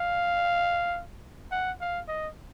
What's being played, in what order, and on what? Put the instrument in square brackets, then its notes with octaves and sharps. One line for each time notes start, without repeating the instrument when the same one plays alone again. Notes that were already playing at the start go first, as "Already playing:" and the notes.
Already playing: [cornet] F5
F#5
F5
D#5